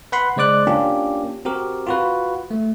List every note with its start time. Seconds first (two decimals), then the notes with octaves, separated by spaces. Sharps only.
0.12 B4 F#5 B5 C6
0.36 C#3 G#3 C5 D5 D6 F#6
0.67 A#3 C#4 D4 F4 G4
1.45 C4 F#4 G4 A#4
1.87 F4 F#4 B4
2.51 A3